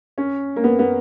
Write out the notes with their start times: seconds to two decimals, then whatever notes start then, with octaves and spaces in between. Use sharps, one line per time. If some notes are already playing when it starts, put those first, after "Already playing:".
0.18 C#4
0.56 A#3
0.64 B3
0.79 B3